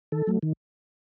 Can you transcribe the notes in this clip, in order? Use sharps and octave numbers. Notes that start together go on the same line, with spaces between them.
D#3 A4
F#3 A3
D#3